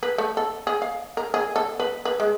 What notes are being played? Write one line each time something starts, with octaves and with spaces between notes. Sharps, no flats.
B4
A3
A4
G#4
F5
A#4
G#4
A4
B4
B4
G#3